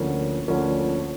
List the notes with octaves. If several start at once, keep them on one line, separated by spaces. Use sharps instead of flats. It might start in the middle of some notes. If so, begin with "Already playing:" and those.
Already playing: D2 D3 F3 A#3 C#4
D2 D3 F3 A#3 C#4